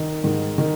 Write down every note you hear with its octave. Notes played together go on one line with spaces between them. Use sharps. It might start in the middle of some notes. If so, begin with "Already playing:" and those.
Already playing: D#3
G#2 D#3
D#3